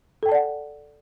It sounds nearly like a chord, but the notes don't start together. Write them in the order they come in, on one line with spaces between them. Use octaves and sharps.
A4 G5 A5 D5 F#5